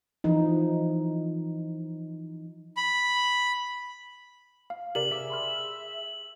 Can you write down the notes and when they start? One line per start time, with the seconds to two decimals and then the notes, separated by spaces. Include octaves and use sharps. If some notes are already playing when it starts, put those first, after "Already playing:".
0.24 E3 F3 D#4
2.77 B5
4.70 F5
4.95 C3 G4 A#4 D5 F#7
5.11 G#4 E5 D6 B6
5.30 B5 C6 F6